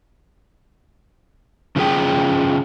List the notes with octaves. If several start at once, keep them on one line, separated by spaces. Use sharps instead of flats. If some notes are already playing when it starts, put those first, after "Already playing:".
C#3 F3 F#3 G#4 G5